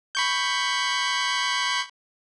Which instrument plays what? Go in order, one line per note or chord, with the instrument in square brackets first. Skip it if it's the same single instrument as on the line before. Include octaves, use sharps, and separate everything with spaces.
[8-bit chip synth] B5 C#6 G6